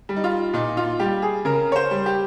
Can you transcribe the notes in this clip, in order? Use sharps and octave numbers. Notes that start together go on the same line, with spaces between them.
G3
D#4
F4
A#2 D#4
F4
G3 G4
G#4
C#3 A#4
C#5
C5
G3
G4